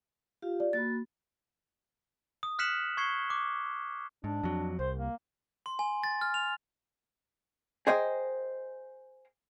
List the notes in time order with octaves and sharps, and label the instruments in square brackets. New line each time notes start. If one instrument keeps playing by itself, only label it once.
[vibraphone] F4 G4 F5
[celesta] D5
[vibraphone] A#3 F#4 B5 [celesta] A6
[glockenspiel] D#6
F6 F#6 B6 C#7 E7 F#7
C#6 G#6 C7 C#7 G7
D6
[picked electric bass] G#2 [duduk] D4
[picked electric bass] F2 F#3
[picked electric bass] C2 [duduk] C5
[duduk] A#3
[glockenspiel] C6
G#5
A6
F6
F7
[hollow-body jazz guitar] G#4 A#4 C5 D#5 G5